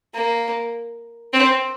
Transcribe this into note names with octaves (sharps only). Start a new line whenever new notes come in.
A#3
C4